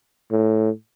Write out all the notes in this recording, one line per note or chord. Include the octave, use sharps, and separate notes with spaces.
A2